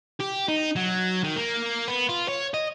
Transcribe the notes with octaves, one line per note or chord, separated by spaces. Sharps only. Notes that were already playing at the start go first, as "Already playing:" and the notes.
G4
D#4
F#3
D#3
A#3
B3
F4
C#5
D#5